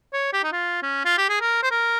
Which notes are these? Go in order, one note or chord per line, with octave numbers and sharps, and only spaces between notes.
C#5
G4
D#4
F4
C#4
F4
G4
G#4
A#4
C5
A#4